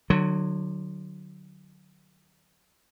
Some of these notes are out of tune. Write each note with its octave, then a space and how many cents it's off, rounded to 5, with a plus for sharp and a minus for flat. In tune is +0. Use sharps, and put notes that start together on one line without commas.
D3 +35 F#3 +0